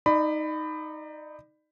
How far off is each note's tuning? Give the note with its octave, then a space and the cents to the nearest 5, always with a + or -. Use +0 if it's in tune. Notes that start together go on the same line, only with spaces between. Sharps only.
D#4 +5 D5 +35 B5 +15